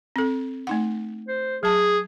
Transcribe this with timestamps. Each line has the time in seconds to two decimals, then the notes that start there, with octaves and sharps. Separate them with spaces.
0.16 C4 A4
0.67 A3 D#4 F#5
1.28 C5
1.63 F#3 G#4 A5